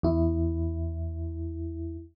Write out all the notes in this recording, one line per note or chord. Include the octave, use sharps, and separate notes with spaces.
E2 E4